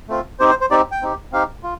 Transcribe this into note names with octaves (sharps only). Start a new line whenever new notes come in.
A3 C4 F4
C4 D#4 G4 C5
C5
C5
C4 D#4 G4 D5
G5
C4 D#4 G4
C4 D#4 G4 F5
F4